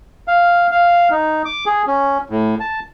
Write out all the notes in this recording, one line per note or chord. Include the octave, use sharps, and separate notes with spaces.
F5
F5
D#4
D6
G#4
C#4
A2
A5